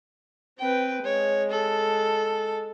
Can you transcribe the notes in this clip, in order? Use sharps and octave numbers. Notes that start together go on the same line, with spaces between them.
C4 B4 G5
G#3 C#5
A4